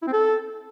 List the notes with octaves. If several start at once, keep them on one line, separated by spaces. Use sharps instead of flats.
E4
C4
A4